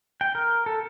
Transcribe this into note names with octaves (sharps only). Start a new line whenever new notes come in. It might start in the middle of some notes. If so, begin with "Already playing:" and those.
G5
A#4
A4